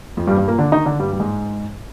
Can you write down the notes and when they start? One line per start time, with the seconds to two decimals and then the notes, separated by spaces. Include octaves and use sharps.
0.17 F2 F3
0.27 G2 G3
0.37 G2 G3
0.48 A#2 A#3
0.58 D3 D4
0.72 D#3 D#4
0.85 D3 D4
0.99 G2 G3
1.13 G3
1.20 G#2 G#3